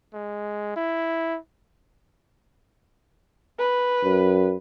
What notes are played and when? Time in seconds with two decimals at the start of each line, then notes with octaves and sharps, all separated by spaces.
0.13 G#3
0.76 E4
3.59 B4
4.04 F#2